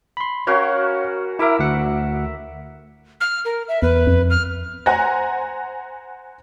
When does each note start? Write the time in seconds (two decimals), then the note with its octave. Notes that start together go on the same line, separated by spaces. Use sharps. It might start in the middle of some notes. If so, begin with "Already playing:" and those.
0.17 B5 C6
0.47 C#4 F#4 A#4 C#5 F5
1.39 E4 A#4 E5 D6
1.59 D2 F#5
3.21 F6
3.45 A#4
3.68 E5
3.82 E2 B4
4.07 F2
4.30 F6
4.86 C5 F#5 G#5 A#5 F#6 A#6